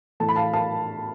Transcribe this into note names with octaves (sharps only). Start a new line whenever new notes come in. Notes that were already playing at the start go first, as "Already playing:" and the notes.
A2 E3 A3 A5
B5
F5 A5
F5 A5